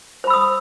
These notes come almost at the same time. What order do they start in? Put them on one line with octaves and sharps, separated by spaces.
C5 B5 E6 D#6